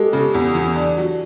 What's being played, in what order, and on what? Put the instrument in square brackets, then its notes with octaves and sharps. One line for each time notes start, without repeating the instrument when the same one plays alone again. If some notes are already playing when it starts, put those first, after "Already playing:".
Already playing: [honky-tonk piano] G#3 [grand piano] G4 A4
[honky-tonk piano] C#3
E2
E3
D4
F#3